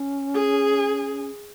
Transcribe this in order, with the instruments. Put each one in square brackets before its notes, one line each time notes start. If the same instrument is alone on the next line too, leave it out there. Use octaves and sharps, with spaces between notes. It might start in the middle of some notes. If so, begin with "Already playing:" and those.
Already playing: [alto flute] C#4
[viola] G#4